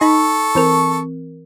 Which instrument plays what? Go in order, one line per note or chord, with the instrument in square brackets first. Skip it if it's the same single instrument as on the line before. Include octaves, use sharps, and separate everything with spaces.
[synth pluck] D#4 B5 [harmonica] A4 C#6
[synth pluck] E3 C4 A#4